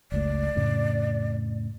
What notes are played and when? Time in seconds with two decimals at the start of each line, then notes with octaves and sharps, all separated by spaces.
0.12 F#1 C#2 A3 D5
0.55 F2 A2 C#3